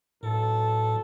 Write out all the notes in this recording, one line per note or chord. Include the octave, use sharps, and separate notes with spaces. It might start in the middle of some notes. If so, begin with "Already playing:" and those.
B1 A2 A4